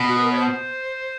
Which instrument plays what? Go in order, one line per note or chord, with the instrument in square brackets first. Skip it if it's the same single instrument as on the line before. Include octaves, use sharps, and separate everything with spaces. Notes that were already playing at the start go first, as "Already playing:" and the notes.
Already playing: [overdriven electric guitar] B2
[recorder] F#4
B4
A#4
C#5
C5